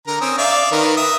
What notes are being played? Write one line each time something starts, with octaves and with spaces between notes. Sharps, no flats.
D3 A#4 A#5
C4 C#4 D#6
D5 E5 F5
D#3 A#4 B4
E5 D#6